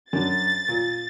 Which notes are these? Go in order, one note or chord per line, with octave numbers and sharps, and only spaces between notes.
F#2 D4 A6
A#2